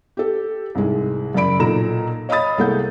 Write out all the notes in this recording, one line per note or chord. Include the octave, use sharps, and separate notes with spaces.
G4 A4
C2 G#2 G#3
F#2 C#3 A#4 D5 B5 D7
B1 A#2 A4 A#5 E7
C#5 D#5 F5 B5 D#6 A6
C2 G#3 A#3 A4 F#5 G6